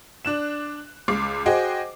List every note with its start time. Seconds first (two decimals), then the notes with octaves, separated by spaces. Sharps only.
0.25 D4 F#6 E7
1.08 C#2 D6 C7
1.46 F#4 G#4 C5 D#5 G5